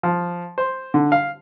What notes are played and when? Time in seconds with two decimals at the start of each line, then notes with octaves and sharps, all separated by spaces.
0.03 F3
0.58 C5
0.94 D3
1.12 F5